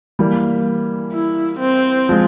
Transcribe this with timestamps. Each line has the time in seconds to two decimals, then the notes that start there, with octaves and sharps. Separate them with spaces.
0.19 E3 G3 A#3
1.13 E4
1.59 C4
2.09 F3 G#3